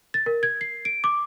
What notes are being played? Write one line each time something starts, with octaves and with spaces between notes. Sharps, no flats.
A6
A#4
G#6
C7
D7
D6